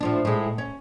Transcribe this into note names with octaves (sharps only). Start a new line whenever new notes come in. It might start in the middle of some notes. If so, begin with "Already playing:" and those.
A2 F3 D4
A2 G#3
C#4